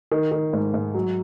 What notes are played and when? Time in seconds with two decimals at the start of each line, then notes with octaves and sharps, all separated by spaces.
0.12 D#3
0.32 D#3
0.53 G#2
0.74 G#2
0.94 F#3